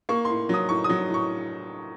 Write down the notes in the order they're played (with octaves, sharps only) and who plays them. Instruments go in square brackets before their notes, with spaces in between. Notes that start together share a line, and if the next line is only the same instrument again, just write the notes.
[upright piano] A#3 C#6
A2 C6
F#3 D#6
A2 C#6
D#6
F#3
A2
C#6